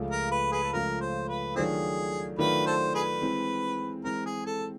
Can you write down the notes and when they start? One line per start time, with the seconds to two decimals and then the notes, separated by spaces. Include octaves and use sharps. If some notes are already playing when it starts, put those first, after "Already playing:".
Already playing: C#2 C#3 F3 A3
0.11 A#4
0.31 B4
0.52 G#4 B4
0.63 A4
0.73 C#2 C#3 F3 A3 A#4
1.01 C5
1.28 B4
1.55 D#3 F#3 A3 C4 D4 F4 G#4
2.38 D#3 F#3 A3 D4 F4 B4
2.66 A4 C5
2.95 G#4 B4
3.22 E3 G#3 C4
4.04 E3 G#3 C4 A#4
4.26 G#4
4.46 A4